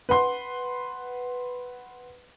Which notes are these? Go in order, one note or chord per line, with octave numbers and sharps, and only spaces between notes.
B4 F#5 C6